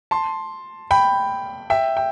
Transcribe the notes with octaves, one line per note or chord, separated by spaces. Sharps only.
A5 C6
G5 B5
E5 G5
G5